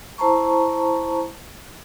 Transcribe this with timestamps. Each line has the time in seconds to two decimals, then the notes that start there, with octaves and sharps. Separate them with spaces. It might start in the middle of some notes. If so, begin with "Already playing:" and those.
0.18 E4 C5 A5 A#5 C#6